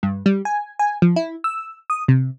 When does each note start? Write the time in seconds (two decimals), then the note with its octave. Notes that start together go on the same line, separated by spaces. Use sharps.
0.03 G2
0.26 G3
0.45 G#5
0.79 G#5
1.02 F3
1.16 E4
1.44 E6
1.90 D#6
2.08 C3